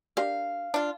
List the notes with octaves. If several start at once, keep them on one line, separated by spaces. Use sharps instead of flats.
D4 G4 A#4 F5
D4 F4